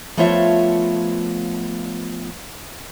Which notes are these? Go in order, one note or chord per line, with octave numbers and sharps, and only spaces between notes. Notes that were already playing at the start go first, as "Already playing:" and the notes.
F3 A3 B3 F4 C#5 E5